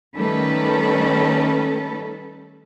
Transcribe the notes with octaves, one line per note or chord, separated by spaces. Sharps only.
D#3 G3 A3 C#4 A4 B4